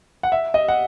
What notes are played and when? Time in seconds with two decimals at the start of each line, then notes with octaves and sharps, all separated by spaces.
0.23 F#5
0.32 E5
0.54 D#5
0.68 F#5